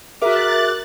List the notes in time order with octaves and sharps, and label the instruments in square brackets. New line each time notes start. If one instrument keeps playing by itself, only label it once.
[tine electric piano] F#4 G#4 [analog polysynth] A#4 E5 [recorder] D6 [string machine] F#6 A6